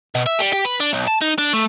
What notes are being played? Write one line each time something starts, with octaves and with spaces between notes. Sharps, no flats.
B2
E5
G3
G4
B4
D4
B1
A5
D#4
D4
A3